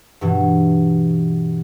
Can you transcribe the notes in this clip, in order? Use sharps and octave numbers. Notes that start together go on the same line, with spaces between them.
G2 B2 E3